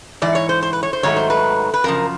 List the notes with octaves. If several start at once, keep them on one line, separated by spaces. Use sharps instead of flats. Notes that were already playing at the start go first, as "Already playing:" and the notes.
G#2 E3 D5
C#5
C5
C5
B4
C#5
C5
G#2 D#3 F#3 A3 C#5
C5
B4
B4
F#2 C#3 F3 A#4